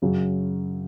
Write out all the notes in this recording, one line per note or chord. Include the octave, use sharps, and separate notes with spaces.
F#2 C#3 F#3